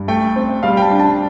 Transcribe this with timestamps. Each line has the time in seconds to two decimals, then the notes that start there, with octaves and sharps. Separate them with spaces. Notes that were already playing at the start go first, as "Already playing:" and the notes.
Already playing: G2
0.08 A3 G5
0.36 C4
0.63 G3 F5
0.77 G5
0.82 A5
0.91 D4
1.00 A5